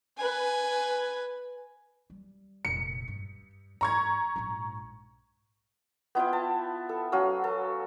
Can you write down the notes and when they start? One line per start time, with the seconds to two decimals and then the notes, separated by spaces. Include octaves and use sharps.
0.17 B4 G#5
2.10 G3
2.65 F1 A#1 C#7
3.08 G2
3.81 G#2 A#5 C#6 G#6
4.36 A#1 G#2
6.15 B3 E4 F4 G5
6.33 A5
6.89 A4
7.12 F#3 C#4 F5 E6
7.44 A4